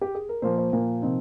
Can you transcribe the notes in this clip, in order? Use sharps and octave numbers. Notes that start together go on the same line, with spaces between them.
G4
G#4
A#4
A#2 F3 A#3 C5
C5
A#2 F3 A#3 A#4
C3 F3 C4 D#4